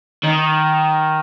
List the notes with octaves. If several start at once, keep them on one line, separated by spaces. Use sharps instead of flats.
D#3